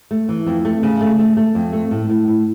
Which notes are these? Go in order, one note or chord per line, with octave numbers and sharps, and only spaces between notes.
A3
E3
F2
A3
C#3
A3
A3
A3
F2
A3
A2
A2
A2